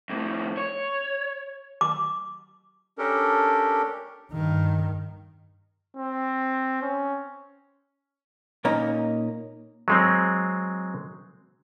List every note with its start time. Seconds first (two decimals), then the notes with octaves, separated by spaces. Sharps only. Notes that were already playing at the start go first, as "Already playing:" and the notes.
0.10 F2 A2
0.57 C#5
1.81 D6
2.98 C#4 D4 G4 A4 A#4
4.32 G2 D#3
5.97 C4
6.82 C#4
8.65 A#2 A#3 C#4 D#4 A#5
9.88 F#3 G#3 C4